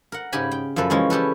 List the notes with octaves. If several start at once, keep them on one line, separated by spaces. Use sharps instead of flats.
A#4 F#5
G#2 C#3 G4 G#5 B5
G5
F#2 F3 A4 B4 E5
E3 F3 G#3 C#4
C#4 G4 A4 B4